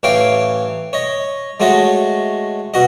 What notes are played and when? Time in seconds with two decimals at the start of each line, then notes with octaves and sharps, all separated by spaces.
0.03 A1 E3 C#5 F5 G5 D6
0.93 C#5 D#5
1.60 G#3 A3 F#4 C#5 D#5
2.74 B2 F#4 D#5